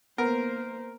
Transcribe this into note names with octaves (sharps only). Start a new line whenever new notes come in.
A#3 B3 A#4 C5